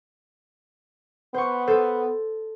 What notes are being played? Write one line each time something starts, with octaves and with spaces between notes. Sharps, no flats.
B3 C5 C#6
A4 C5